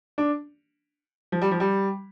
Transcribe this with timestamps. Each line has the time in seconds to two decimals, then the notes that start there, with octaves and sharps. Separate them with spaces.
0.18 D4
1.32 F3
1.42 G3
1.51 F3
1.60 G3